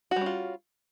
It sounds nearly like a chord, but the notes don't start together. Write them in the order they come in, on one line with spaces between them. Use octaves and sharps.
F#4 G3 C#4 F4